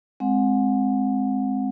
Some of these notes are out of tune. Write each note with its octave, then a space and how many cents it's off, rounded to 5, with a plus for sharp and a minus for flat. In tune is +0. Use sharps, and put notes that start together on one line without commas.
G#3 +0 C4 +0 F#5 -25